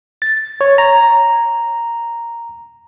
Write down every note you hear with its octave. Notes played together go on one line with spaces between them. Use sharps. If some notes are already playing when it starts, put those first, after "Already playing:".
A6
C#5
A#5